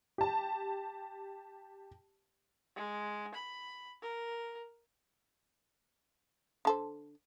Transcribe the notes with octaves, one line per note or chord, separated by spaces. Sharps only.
G4 A5
G#3
B5
A#4
D3 A4 C5